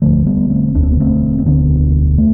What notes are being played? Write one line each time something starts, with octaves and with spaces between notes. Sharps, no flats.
E1 D2 D3 F3 A3
G3 B3
A3 C4
E1 D2 D3 D4
C4
B3
A3 C4
C4
E1 D2 D3 B3 D4
A3